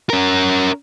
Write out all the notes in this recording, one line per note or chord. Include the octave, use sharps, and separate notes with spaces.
C#4 A#4